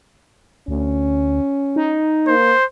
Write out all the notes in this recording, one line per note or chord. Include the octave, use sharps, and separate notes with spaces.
D2 C#4
D#4
A#3 C5